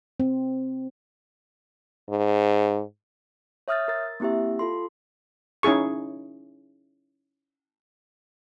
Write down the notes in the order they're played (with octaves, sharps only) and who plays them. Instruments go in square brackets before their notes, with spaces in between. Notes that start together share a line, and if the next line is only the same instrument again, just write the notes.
[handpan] C4
[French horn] G#2
[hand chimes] C#5 E5 D#6 F6 G6 A6
A#4 A6
A#3 C4 E4 G4 E5
F4 A4 C6
[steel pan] C#4 D#4 E4 G#4 C#6